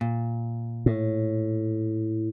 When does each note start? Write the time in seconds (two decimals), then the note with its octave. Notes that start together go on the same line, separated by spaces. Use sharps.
0.01 A#2
0.86 A2